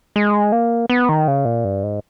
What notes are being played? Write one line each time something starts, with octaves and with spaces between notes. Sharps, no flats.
G#3
A#3
B3
D#3
C#3
A#2
G2
G#2